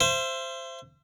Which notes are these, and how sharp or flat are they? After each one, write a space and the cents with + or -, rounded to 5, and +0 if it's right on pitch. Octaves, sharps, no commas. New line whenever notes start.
C5 +0 E5 +40